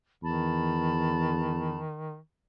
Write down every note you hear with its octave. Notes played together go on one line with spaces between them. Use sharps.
E2 D#3 A5 B5